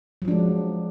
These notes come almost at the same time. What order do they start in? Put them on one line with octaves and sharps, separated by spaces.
F#3 F3 D4 G#3